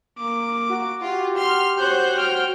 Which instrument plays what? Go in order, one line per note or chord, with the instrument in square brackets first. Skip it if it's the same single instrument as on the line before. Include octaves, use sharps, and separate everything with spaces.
[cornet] A#3 [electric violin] D6
[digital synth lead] F#4
[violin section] F4 [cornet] G4
[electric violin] C6 [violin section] F6
[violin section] C5 C#5 [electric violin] F#6 G6
[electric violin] G5 F6